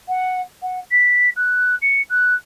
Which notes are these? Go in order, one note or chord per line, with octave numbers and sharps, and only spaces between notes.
F#5
F#5
B6
F#6
C#7
F#6